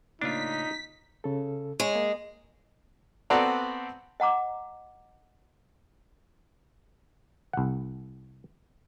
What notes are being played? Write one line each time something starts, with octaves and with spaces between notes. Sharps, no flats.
A2 C#3 A#3 D4 D#4 F4 B6
C#3 A4
G#3 C#5
A#3
B3 C4 F#4 A4 D5 A#5
D#5 F#5 A#5 D6
C2 F#5